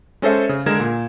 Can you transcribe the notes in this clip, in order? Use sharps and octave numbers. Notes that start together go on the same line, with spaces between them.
G#3 C#4 A4 C5 E5
C#3
D3 G#3 A#4 G#6 E7
A#2